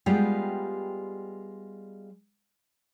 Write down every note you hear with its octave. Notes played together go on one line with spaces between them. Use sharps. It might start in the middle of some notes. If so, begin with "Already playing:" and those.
G3 G#3 B3 F4 G4